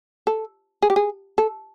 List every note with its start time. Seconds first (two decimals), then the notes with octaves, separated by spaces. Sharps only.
0.27 A4
0.82 G#4
0.90 G4
0.96 G#4
1.38 A4